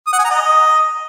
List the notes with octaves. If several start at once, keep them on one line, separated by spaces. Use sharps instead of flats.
D#6
F#5
G#5
A#5
D#5